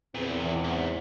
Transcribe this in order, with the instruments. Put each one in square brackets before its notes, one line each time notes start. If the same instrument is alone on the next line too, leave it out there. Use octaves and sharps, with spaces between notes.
[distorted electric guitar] B1 A#2 [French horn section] E2 [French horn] C4
[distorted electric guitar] G#2